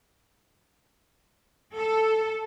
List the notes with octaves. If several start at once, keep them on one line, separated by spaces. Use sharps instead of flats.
A4